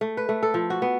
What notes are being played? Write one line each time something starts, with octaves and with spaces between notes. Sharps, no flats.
A3
B4
A3
A4
F3
F#4
B3